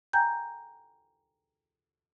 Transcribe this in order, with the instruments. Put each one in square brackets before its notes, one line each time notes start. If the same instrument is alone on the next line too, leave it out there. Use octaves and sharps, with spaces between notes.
[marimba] G5 G#5 A#5 G6